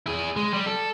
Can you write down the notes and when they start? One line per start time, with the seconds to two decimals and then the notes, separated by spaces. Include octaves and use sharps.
0.06 E4 G#4
0.36 G#3
0.53 G3
0.66 A4